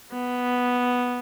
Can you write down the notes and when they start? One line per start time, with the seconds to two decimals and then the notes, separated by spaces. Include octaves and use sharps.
0.13 B3